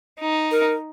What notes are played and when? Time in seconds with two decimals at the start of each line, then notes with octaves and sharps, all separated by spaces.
0.19 D#4
0.51 A#4